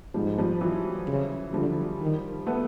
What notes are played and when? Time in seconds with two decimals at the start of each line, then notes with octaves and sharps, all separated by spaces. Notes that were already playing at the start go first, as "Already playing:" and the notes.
0.14 G#2 F3 G3
0.38 F3 G3
0.61 E3 F#3
1.07 C#3
1.53 D3 F3 G3
2.00 D#3
2.46 A3 B3